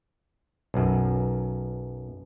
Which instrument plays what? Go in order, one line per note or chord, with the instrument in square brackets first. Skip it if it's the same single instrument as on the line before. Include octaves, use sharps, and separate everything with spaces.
[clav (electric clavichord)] B1 F#2